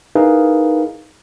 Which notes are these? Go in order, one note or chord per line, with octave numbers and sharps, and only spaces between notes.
D#4 E4 G#4 A#4 B4 F5